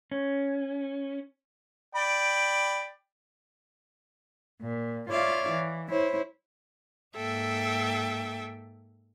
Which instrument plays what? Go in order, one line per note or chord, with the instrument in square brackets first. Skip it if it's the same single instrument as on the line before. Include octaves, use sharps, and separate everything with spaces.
[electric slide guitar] C#4
[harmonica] D5 G5 B5
[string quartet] A#2
F4 C#5 D5 E5 F5
E3
E4 C5 C#5
G#2 A#3 A4 E5 G5